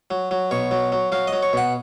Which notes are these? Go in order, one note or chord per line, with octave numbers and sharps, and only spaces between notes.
F#3
F#3
B2 C#5
F#3
F#3
F#3 F5
D#5
F#3
C#5
B2 F#5